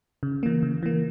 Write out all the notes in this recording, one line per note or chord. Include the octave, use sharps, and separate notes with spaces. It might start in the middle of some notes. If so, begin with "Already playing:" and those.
C#3
E3 A#3
C#3
E3 A#3